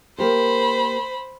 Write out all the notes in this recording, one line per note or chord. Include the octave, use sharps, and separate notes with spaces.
A#3 G4 A#4 C5 B5